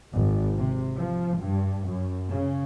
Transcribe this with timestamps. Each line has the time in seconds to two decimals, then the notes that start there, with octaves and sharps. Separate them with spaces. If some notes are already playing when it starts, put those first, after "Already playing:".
0.13 G#1
0.56 C3
0.98 F3
1.38 G2
1.86 F#2
2.29 C#3